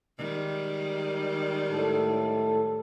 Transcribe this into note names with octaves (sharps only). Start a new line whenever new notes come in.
D#3 G3 G#3
A2 A4